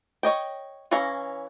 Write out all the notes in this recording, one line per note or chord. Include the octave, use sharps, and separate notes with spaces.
C#5 D#5 G5
E3 C#4 C#5 F5 A#5